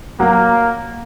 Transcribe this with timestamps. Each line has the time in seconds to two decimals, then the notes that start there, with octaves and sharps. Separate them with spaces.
0.20 F#3 A#3